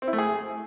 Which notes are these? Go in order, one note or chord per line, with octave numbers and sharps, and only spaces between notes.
C4
E4
A3
G#4